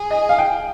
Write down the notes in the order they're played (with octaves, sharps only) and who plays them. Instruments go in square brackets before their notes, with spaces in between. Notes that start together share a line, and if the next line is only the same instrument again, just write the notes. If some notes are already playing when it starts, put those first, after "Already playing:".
Already playing: [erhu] G#4
[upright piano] D#5
F5
G5